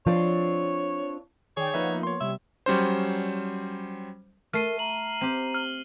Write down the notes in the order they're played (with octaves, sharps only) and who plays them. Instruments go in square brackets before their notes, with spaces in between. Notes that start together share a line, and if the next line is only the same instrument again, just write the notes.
[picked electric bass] F3 [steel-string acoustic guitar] C4 D4 F4 [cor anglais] C#5
[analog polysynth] D#3 D5 G5 [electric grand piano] G#4 [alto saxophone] C#5
[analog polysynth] F3 A#3 B3 [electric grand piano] D#4 B4 E5
[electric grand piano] C#5 C6
[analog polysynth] C3 G3 [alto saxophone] E5
[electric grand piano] F#3 G3 C#4 C5
[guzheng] A3 [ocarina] A#4 [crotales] F6 C7 D#7
[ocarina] A#5 [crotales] F#7
[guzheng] C4 G4
[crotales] F6